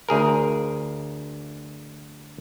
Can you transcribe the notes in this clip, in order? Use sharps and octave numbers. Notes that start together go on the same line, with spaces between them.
D2 G#4 A#4